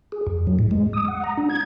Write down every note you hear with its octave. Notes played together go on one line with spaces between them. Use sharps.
G#4
F2
F#3
A2
G#3
D#6
F#5
A#5
D4
G#6